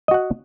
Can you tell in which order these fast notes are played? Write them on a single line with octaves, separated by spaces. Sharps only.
D#5 F#4 F#5